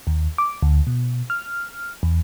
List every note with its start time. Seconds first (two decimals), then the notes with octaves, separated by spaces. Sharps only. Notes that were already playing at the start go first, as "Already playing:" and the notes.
0.07 D#2
0.38 D6
0.63 D2
0.87 B2
1.30 F6
2.03 E2